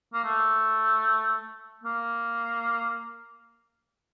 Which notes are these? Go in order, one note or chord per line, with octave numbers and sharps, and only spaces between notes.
A#3
A3
A#3